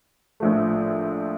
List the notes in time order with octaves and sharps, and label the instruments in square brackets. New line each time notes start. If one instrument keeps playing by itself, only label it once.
[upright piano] A#1 A2 F3 A3